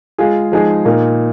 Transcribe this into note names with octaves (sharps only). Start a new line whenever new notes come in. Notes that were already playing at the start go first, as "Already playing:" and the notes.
G#3 F4 G#4
F3 G#3 D#4 G#4
A#2 A#3 D#4